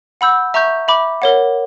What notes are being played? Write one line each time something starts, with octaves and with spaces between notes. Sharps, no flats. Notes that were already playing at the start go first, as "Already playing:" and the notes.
F#5 B5 E6 G6
E5 A#5 C#6 G6
E5 B5 D6
A#4 C#5 F#5